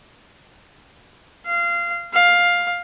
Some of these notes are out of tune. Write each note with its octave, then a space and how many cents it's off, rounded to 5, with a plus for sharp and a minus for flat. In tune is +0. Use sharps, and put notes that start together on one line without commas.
F5 -20
F5 +10